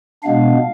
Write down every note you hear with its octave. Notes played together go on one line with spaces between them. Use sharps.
B2 G#3 B3 D4 F5